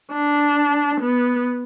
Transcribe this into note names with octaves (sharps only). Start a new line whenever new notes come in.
D4
B3